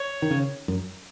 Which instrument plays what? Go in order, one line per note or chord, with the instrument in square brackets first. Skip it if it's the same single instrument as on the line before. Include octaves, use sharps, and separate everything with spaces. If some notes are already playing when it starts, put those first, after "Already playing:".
Already playing: [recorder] C#5
[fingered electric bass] D#3
C#3
F#2